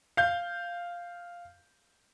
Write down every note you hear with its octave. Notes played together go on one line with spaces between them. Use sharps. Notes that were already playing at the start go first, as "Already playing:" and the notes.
F5 G6